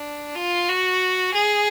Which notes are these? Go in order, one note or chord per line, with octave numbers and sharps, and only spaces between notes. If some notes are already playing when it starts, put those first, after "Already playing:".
Already playing: D4
F4
F#4
G#4